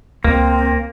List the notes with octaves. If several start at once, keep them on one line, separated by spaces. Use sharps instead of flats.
C#2 A#3 C4